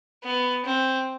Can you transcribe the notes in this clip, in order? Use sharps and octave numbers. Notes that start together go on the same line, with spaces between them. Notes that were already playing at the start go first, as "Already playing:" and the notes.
B3
C4